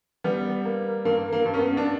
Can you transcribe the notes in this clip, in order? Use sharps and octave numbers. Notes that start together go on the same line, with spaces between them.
G3 B3
A#3
G2 A#3
A#3
G2
C#4
B3
D4